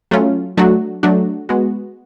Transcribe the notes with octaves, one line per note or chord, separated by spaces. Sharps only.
F#3 A3 C#4 F4
F#3 A3 D4 F#4
F#3 A3 D4 F#4
G#3 B3 F#4